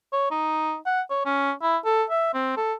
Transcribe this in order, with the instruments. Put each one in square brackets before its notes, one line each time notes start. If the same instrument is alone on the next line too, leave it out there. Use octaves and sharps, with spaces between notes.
[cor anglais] C#5
D#4
F#5
C#5
C#4
E4
A4
E5
C4
A4